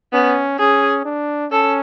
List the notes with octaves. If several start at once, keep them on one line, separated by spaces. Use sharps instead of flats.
B3 C#4
C#4 G#4
D4
C#4 A4